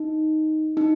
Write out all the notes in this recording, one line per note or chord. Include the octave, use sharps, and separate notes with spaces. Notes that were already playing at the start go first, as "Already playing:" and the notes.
Already playing: D#4
D#4